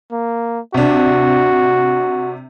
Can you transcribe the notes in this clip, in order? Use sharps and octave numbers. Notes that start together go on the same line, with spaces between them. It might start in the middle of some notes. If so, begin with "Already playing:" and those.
A#3
C3 D4 F#4